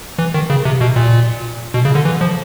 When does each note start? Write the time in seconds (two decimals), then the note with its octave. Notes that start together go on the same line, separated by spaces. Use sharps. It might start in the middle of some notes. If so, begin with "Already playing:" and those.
0.18 E3
0.34 D#3
0.50 C#3
0.65 C3
0.81 B2
0.96 A#2
1.74 B2
1.85 C#3
1.95 D3
2.05 E3
2.21 F3